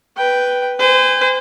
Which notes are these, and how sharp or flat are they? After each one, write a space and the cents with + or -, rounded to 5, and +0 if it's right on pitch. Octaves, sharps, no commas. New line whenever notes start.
B4 +0 G5 +0
C5 -40 G#5 -35